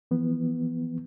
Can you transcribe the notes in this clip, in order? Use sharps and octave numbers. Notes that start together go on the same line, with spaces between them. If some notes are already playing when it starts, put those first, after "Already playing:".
E3 F3 B3